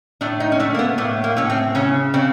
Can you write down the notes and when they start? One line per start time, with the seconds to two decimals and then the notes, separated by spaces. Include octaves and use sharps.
0.21 A2 D4
0.40 D#4
0.52 C#4
0.59 A3 D4
0.74 A#3
0.79 B3
0.98 A2 A#3
1.24 A#3
1.36 A2 C#4
1.50 C4
1.75 C#3 C#4
2.14 C#3 C4